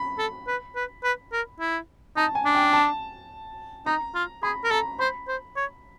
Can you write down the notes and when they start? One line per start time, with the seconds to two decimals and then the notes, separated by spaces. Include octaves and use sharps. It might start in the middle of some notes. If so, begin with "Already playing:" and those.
Already playing: B5
0.18 A4
0.48 B4
0.76 B4
1.04 B4
1.33 A#4
1.60 E4
2.17 D#4 A5
2.35 G#5
2.45 D4
2.55 G5
2.73 A5
3.86 D#4 A#5
4.15 F4
4.43 G#4 B5
4.64 A#4
4.71 A4 A#5
4.99 C5 B5
5.28 C5
5.57 C#5